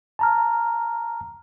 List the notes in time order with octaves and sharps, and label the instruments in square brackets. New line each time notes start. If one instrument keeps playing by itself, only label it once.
[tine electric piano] A5 A#5 F6